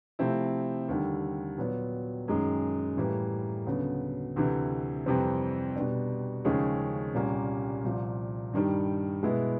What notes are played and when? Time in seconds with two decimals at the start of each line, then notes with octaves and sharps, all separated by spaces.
0.19 C3 F3 A3 C4 E4
0.88 D#2 D3 G3
1.58 A#2 F#3 B3
2.28 F#2 D#3 G#3
2.97 A2 E3 G3 A#3
3.67 D2 C#3 F#3 B3
4.36 D2 C3 E3
5.06 F2 C3 E3 G3 C4
5.76 B2 G3 B3 D4
6.45 D#2 C#3 F3 G#3 C#4
7.14 C2 A#2 G3 A#3 C#4
7.84 C2 A#2 F3
8.53 G2 D#3 G3
9.23 B2 G#3 B3 E4